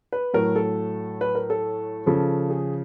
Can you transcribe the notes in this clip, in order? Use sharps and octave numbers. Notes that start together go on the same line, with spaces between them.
B4
A2 F#3 A#4
A4
B4
A#4
A4
C#3 F3 A4
G#4